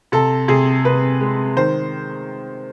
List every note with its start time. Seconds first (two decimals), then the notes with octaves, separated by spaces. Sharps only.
0.12 C3 A4
0.48 C3 G#4
0.85 C3 B4
1.21 G#3
1.56 D#3 C5